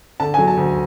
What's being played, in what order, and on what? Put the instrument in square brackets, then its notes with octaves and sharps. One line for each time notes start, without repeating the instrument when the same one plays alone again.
[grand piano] D3 A5
F#3 G#5
A5
D2